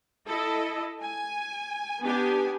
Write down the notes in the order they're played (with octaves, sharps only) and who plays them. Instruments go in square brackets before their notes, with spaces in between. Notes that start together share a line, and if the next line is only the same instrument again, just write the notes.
[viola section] E4 A4 D#5
G#5
B3 D4 G4 G#5